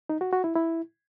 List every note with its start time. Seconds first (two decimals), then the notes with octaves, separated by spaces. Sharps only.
0.09 D#4
0.21 F#4
0.32 F#4
0.44 E4
0.55 E4